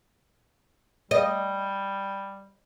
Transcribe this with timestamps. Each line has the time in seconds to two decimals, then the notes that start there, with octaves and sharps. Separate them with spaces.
1.11 G3 D#5